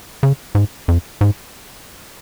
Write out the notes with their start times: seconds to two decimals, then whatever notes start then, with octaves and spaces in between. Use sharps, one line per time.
0.23 C#3
0.55 G#2
0.88 F2
1.21 G#2